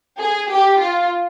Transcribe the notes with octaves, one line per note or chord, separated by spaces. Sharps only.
G#4
G4
F4